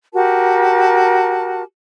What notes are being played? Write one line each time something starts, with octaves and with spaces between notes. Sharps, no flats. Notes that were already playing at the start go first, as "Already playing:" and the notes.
F#4 G4 A#4 A5